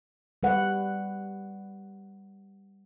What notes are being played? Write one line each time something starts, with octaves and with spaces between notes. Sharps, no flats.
G3 B4 F#5